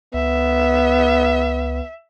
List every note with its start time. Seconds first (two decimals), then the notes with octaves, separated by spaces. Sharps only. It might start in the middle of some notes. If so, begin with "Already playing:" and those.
0.14 C#2 B3 E5